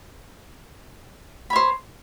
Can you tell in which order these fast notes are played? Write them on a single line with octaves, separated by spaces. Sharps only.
B5 C#5 C5